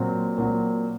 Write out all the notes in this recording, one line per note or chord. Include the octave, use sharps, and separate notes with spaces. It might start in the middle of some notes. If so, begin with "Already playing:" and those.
Already playing: A#2 F#3 C4
A#2 F#3 C4